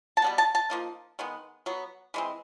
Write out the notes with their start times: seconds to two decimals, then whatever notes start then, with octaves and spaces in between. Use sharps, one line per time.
0.17 A5
0.22 B2 G3 B3
0.38 A5
0.55 A5
0.70 F3 A#3 D#4
1.19 D#3 G#3 B3
1.66 F#3 B3
2.14 E3 G#3 C4